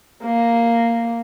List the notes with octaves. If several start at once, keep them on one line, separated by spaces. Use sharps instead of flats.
A#3